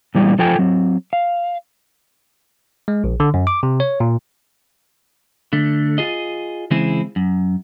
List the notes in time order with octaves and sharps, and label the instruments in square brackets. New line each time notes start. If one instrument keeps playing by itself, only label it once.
[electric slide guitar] A#2 E3 G3 G#3 A#3 B3
F3 F4 A4 G5 G#5
F#3 C4
F5
[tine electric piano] G#3
A#1
D3
F#2
D6
C3
C#5
A#2
[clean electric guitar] D3 A3
F4 G#4 D#5
C#3 E3 G#3 C4 E4 G#4
F#2